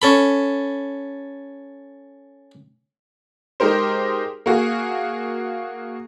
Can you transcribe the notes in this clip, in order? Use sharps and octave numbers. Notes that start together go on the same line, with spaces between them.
C#4 A4 B5
G#3 D#4 G4 A#4 C5
A#3 F#4 G#4